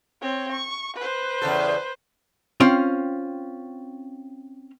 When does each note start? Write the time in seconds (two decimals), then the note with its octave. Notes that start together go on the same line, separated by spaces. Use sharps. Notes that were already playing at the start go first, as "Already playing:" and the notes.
0.21 C4 C#5
0.52 C#6
0.96 B4 C5
1.42 E2 C#3 A4
2.60 C4 C#4 F4 G5